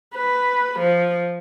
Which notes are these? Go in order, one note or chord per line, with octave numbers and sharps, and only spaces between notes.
B4
F3